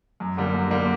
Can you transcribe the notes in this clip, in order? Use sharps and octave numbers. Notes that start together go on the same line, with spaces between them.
F#2
D3 G3 A#3
F#2
D3 G3 A#3